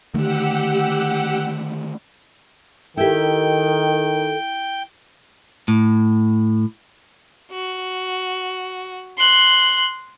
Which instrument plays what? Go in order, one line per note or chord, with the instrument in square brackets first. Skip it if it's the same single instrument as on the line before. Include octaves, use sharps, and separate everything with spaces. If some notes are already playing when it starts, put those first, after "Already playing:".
[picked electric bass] D3 D#3 A3 [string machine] G4 F#5 E6
[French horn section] D#3 [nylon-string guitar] E4 G4 [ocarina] A4 [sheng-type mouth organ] G5
[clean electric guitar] A2
[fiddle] F#4
C6 F#6